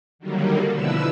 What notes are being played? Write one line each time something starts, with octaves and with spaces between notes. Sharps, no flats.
D3 D#3 F#3 G3 A#3
B2 D3 F3 E4 B4 E6